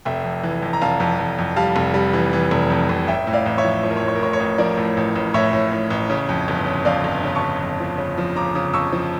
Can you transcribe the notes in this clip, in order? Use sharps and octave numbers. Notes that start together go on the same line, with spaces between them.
F1 E5 G5
F2
E3
F2
A#5
F1 F5 A5
F2
F2
F2
G3 F5 A5
F1
G3
E3
E3
F1
F2
F1
A1 E5 G5
A2
D5 F5
A1
C#5 E5
F3
F3 C#5
A#4
C#5
A2
C#5
A#4
A2 C#5
C#5
A1
F3 A#4 D5
A2
A1
A1
A2 C#5 E5
A2
A2
A1
C#3
F2
G1
C#3
F2 D5 F5
G1
C#3
A5 C#6
G1
F2
F3
C#3
F3
C#3 A#5 D6
C#3
F2 C#6 E6
F3